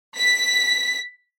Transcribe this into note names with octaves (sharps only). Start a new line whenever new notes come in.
B6